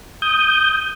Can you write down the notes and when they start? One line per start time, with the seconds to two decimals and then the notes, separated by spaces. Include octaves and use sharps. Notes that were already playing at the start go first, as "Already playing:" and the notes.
0.22 D#6 G6